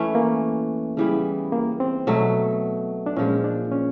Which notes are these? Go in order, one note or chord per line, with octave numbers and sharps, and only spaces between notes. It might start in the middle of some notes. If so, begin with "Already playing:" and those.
Already playing: E3 A3 C#4
A#3
C#3 E3 G3 B3
A#3
C4
B2 F#3 A3
D4
A#2 F3 G#3 C#4
D4
C#4